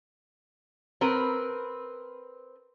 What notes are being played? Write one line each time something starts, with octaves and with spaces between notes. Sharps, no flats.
C4 A#4 B4